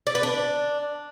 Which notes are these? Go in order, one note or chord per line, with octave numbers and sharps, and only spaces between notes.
D5
B4
D4